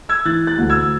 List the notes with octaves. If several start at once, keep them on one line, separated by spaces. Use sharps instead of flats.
E6 G#6
E3 F#6 A6
F#6 A6
D2
E6 G#6